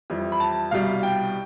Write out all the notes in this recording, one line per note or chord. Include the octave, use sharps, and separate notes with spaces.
F2 E3 G3
B5
A5
C2 B2 G3 F5
G5